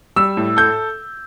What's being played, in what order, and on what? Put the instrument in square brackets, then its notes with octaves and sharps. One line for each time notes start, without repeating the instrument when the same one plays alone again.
[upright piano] G3 [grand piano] E6
[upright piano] A2
[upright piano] A4 [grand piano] G6